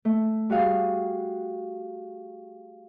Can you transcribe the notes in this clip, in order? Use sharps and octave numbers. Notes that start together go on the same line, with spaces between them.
A3
G3 F#4 G#4 F5